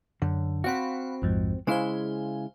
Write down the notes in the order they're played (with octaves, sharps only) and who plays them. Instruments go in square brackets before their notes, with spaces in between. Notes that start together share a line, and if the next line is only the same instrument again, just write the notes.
[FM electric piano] F#2 [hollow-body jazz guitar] D3
[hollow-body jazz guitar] C4 F#4 [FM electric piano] F5 F#5 B5
[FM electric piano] A#1 F2 G#2
[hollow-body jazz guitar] C#3 G#3 E4 [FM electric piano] C5 F5 G#5